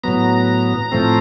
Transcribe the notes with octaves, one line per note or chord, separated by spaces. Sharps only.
A2 F#3 B3 A#5
A2 F3 A3 C4